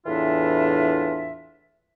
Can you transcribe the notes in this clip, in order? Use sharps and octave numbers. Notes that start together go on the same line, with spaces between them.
E2 A2 E3 D4 F4 E5